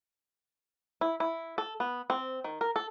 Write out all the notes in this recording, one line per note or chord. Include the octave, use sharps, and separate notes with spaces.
E4
E4
A4
B3
C4
D#3
A#4
A4